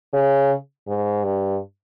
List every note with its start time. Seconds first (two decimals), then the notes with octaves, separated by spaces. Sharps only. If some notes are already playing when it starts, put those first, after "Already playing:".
0.13 C#3
0.88 G#2
1.24 G2